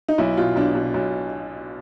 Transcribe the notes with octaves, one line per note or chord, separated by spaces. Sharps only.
D#4
B1 E4
B2 F4
B1 D4
B2
B1